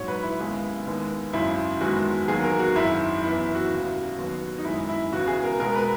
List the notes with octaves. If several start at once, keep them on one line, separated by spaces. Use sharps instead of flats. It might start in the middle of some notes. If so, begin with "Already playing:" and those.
Already playing: A#1 G#2 F#3 C#5
B4
E4
D#2 C#3 G#3 B3
D#2 D#3 G#3 B3
G#1 F#2 C#3 E4
F#1 E2 D#3 G#3 F#4
E2 D#3 F#3 A#3 G#4
A#4
F#4
G#1 F#2 D#3 E4
F#2 E3 B3 E4
E4
F#4
E1 D#2 C#3
D#2 D#3 F#3 B3
D#4
F#1 F#2 D#3 G#3 E4
E4
E1 E2 C#3 F#4
G#4
A#4
B1 B2 G#3 B3 A#4
B4